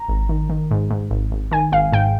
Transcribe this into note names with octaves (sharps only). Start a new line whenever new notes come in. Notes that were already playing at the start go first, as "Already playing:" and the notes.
Already playing: A#5
G#1
D#3
D#3
G#2
G#2
G#1
G#1
D#3 G#5
G#1 F5
G#2 G5